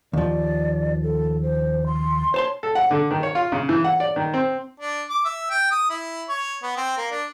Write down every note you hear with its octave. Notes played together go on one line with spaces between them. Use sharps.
D#2 F3 D5
A4
C5
C6
C5 C#5 A5 C6
A4
F#5
D3
D#3
C#5
F4
C#3
E3
F#5
D5
D#3
C4
D4
D6
E5
G5
D#6
E4
C#5
B3
C4
A#3
D4